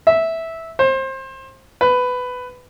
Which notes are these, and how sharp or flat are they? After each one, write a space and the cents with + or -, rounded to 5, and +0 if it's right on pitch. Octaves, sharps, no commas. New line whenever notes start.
E5 -10
C5 +25
B4 +15